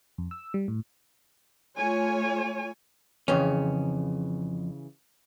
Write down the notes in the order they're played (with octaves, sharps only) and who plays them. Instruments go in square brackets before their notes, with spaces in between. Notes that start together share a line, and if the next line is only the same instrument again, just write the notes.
[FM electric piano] F2
E6
G3
A2
[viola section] A3 F4 C#5 G#5
[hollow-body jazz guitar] F2 C#4 [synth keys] C#3 E3